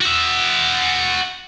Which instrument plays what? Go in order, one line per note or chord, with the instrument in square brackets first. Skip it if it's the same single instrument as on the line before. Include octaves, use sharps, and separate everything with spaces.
[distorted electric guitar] F#4 E5